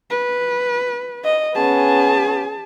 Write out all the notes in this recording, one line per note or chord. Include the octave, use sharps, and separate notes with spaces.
B4
D#5
B3 C#4 G#4 A5